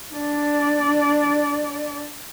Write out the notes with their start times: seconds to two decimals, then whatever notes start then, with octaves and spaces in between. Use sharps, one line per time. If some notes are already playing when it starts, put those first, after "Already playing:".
0.14 D4 D5